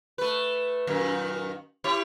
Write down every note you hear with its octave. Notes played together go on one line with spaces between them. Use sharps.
A3 B4
F#2 A#2 D#3
E4 G4 C#5